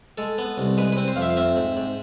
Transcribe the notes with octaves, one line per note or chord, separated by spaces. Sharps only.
G#3 A4
B3
C2
G#3 B4
C4 B4
C5
F2 F5
E5
F5
C4 E5
G#2
G#2